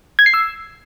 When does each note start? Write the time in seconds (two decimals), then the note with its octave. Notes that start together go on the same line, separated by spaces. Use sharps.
0.19 G#6
0.26 C7
0.34 E6